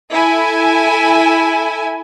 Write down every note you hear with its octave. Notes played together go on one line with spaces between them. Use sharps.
E4 A4 G#5